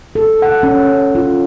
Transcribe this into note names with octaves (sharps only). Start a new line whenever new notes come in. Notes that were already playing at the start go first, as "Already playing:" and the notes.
A4
F#5
C#4
F4